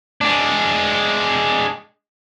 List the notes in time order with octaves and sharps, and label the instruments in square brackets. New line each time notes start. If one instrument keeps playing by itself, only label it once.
[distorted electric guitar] G#3 D4